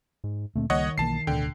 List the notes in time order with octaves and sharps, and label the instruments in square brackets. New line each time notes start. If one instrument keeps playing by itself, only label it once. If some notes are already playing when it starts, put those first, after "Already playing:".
[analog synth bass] G#2
[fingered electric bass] D2 A#2 C4 [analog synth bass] A3
[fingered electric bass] C#2 G3 A#3 [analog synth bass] D#3 [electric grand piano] C#5 D#5 F#5
[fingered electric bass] B1 E3 A#3 [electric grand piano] A5 C7
[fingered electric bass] D1 D2 B2 [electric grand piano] D3 G5